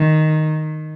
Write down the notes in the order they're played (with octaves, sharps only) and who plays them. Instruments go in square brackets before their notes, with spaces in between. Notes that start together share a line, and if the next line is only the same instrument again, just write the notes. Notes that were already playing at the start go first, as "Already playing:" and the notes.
Already playing: [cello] D#3